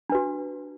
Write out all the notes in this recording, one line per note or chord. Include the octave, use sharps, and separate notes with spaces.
D4 F#4 B4